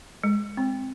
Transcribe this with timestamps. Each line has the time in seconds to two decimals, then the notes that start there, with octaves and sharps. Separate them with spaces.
0.24 G#3
0.57 C4